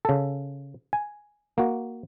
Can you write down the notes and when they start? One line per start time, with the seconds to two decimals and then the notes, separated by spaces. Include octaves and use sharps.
0.05 C#3 A4
0.93 G#5
1.58 A#3 F#4